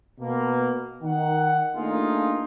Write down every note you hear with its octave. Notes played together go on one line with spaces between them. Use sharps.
B2 A#3
D#3 F#5
A3 A#3 D4 D#4 F4 G#4